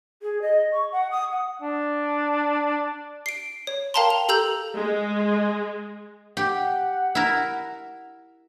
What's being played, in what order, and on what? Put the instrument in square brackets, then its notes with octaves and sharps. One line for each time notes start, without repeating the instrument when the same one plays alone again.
[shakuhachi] G#4
D#5
C#6
F#5
D#6
F#5
[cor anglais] D4
[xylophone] C7 D7
C#5
A#4 F5 G5 A5 A#5 C6
F7
G4 A4 A#5 E6 G6 F#7
[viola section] G#3
[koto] G4 [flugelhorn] F#5
[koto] E4 A#4